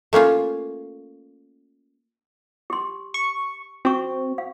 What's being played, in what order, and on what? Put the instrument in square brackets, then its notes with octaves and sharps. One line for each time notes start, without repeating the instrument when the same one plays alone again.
[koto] A3 A#3 C#4 F4
[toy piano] G4 C6
[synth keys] C#6
[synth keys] C4 [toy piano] F#4 C#6
[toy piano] F5